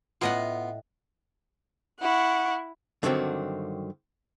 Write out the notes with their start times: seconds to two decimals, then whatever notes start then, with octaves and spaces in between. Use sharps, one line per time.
0.21 A2 B3 F4 D#5 F#5
2.01 E4 F#5 C#6
3.03 G2 D3 D#3 F#3 C4 F#4